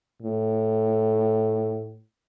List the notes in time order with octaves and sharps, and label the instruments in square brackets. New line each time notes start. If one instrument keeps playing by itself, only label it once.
[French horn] A2